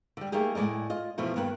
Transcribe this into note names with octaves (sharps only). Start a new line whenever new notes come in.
D3 G3
A3 A#3 D#4 G4 G#4
A2 G#3 A#3 D5 D#5
F4 D#5
E2 B2 F3 A3
G2 D#3 A#3 B4